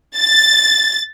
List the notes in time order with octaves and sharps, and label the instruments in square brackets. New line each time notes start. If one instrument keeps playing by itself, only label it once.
[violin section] A6